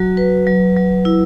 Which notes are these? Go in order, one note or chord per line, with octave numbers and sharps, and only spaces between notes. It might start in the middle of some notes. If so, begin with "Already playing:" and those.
Already playing: F#3 F#4
B4
F#3
F#3
E4